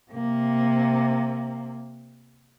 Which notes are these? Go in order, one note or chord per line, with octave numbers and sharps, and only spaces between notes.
C3 A#3